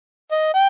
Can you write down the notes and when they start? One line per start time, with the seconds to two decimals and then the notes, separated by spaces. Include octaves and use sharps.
0.31 D#5
0.54 G5